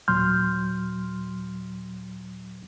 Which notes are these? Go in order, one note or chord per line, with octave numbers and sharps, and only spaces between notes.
D#2 A#2 F#3 C6 F6 G6